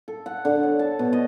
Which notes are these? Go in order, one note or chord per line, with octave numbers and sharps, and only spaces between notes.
A4
F#5
D3
C#5
A5
B2
D#5